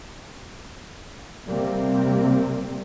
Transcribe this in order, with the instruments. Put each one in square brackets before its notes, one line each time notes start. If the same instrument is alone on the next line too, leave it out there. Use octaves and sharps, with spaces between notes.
[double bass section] C3 G3 A#3 C4